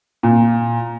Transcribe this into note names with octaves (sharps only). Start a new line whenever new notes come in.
A#2